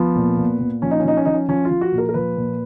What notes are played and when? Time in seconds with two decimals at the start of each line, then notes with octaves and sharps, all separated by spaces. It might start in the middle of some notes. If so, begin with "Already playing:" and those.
Already playing: F3 B3
0.16 A#2
0.38 A#2
0.60 A#2
0.82 F3 C#4
0.91 D#4
1.00 C#4
1.04 F3 D#4
1.17 C#4
1.25 F3 D#4
1.34 C#4
1.48 F3 C#4
1.65 F4
1.70 F3
1.81 F#4
1.92 A#2
1.98 A#4
2.09 A#4
2.14 F3 B4
2.36 A#2